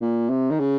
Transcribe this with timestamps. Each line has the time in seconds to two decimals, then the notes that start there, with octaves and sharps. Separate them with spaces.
0.01 A#2
0.30 C3
0.50 D#3
0.59 C#3